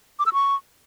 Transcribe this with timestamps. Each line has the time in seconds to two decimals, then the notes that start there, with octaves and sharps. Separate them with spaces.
0.19 D6
0.26 E6
0.33 C#6